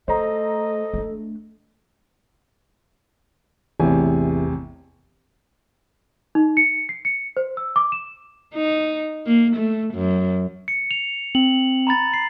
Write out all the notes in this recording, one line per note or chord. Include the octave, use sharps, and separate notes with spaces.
A3 A4 C5 D#5 A#5
A3 D4
A1 E2 C3 G#5
D#4
C#7
C7
C#7
C5
E6
D6
E7
D#4
A#3
A3
F#2
C#7
F7
C4 F#7
A#5 B5 A6
C7